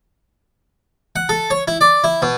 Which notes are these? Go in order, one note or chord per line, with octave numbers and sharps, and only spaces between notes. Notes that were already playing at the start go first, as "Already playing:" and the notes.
F#5
A4
C#5
E4
D5
E4
B2